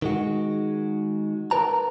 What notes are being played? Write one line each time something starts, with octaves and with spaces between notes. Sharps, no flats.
D#3 G#3 F#4
A#4 B4 A5 A#5